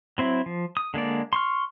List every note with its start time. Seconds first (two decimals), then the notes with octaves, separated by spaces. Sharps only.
0.18 F#3 C4 E4
0.46 F3
0.77 D#6
0.94 D3 G#3 A#3 D5
1.33 C6 C#6 F6